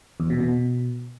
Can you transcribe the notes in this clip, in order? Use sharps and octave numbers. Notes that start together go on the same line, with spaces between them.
E2
B2
B2